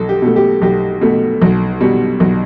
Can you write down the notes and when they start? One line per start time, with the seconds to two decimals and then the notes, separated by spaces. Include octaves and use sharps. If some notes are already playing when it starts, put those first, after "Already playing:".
Already playing: B1 A4
0.09 G4
0.22 B2 A3
0.36 G4
0.62 B1 G4
1.01 B2 A3
1.42 B1
1.81 B2 G3
2.20 B1